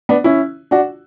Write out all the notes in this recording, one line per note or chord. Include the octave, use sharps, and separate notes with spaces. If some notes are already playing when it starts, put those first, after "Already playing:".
B3 D4
C#4 E4
D4 F#4